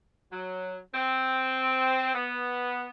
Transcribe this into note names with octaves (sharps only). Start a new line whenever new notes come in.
F#3
C4
B3